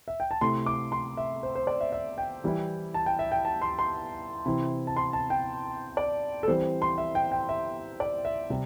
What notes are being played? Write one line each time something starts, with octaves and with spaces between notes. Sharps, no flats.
E5
G5
A5
C3 A3 E4 C6
D6
C6
E5
C5
C5
D5
E5
E5
G5
E3 G3 E4
A5
G5
E5
G5
A5
C6
C6
C3 E3 C4 E4
A5
C6
A5
G5
D5
A4
E3 G3 C4 C5
C6
E5
G5
G5
E5
D5
E5
C3 G3